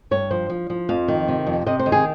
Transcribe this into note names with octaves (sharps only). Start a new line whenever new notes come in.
G2 C#5
F3 C5
F3
F3
F2 F5
D#3
C3
F2
C3 D#5
C5
D#3
G#4